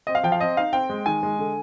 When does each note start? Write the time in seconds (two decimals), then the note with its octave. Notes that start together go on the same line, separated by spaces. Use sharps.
0.07 C4 D#5
0.15 F5
0.23 F3 G5
0.32 F5
0.40 C4 D#5
0.57 D#4 F5
0.73 C4 G5
0.90 G#3
1.06 D#3 G#5
1.23 G#3
1.39 D3